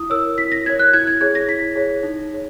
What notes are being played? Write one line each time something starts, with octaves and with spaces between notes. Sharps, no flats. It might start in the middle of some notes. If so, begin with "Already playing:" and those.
Already playing: E4 D#6
A#4 C#5 E6
E4 B6
A#6
A#4 C#5 G#6
F#6
E4 G#6
G#6
G#4 C#5 G#6
A#6
E4 B6
G#4 C#5
D#4
G#4 C#5